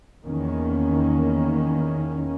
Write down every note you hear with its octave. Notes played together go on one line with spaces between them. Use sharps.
E2 D#3 A#3 C#4